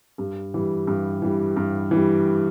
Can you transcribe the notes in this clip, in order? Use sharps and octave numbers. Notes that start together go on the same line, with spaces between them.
G2
E3 G3
G2
E3 G3
G2
E3
G3